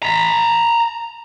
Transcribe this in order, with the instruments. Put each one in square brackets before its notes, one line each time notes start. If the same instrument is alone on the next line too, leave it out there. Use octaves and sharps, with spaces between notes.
[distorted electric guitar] A#5 B5